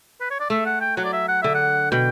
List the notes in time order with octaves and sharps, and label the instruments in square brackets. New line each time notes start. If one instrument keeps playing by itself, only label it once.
[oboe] B4
C#5
D5
[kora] A3 [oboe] E5
[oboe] F#5
G5
[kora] F#3 [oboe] F#5
[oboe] D5
E5
F#5
[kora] D3 [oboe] E5
[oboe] F#5
[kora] B2 [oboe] G5